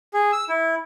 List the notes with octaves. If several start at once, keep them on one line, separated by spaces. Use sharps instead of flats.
G#4
E6
E4